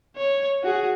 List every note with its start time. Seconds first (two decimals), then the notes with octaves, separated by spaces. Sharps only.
0.16 C#5
0.63 F#4 G#4